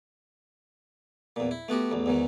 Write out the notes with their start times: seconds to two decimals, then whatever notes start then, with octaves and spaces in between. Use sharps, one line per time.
1.36 E2 A#2
1.51 E4
1.69 A3 B3 F#4 G4
1.91 A1 E2
2.06 E2 G#2 D#3